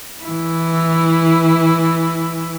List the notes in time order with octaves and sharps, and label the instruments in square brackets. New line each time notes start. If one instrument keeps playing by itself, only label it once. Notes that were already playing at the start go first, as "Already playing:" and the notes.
[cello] E3 E4